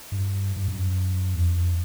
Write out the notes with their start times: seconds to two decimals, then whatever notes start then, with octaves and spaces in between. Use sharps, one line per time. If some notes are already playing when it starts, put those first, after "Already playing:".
0.12 G2
0.56 G2
0.68 F#2
1.35 E2
1.41 F2